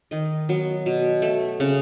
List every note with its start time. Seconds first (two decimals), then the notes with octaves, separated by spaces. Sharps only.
0.11 D#3 D#5
0.49 F#3 B3
0.86 B2
1.22 A3
1.60 C#3